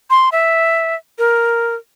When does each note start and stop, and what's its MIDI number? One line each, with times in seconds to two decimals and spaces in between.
0.10 0.29 84
0.32 0.95 76
1.18 1.75 70